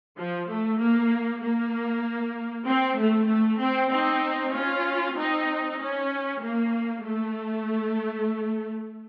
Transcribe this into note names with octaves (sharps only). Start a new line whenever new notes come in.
F3
A3
A#3
A#3
C4
A3
A3
C4
C4 D#4
C#4 F4
C4 D#4
C#4
A#3
A3